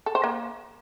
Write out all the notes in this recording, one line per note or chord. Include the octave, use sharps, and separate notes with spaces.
A4
C5
A#3